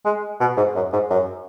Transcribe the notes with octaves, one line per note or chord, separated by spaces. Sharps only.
G#3
B2
G#2
F#2
G#2
F#2